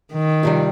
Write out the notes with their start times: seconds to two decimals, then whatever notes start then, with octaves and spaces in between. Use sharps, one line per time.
0.13 D#3
0.43 F2 C3 G3